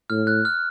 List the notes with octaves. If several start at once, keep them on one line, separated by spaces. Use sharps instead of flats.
A2 F6
F#6
F6